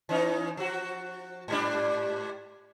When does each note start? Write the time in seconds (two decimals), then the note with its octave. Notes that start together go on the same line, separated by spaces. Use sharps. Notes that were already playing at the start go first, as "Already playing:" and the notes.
0.09 E3 C#4 D#4
0.57 F3 F#4
1.48 G#2 G3 D4